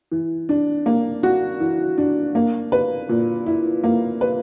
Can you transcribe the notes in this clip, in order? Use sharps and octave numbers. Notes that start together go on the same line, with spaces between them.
E3
D4
A#3
F#4
E3
D4
A#3
B4
A#2
E4
A#3
B4